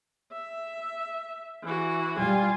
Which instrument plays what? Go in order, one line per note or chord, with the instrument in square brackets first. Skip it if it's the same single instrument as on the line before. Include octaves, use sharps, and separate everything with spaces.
[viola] E5
E3 F#4
[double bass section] G3 [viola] F4 G#5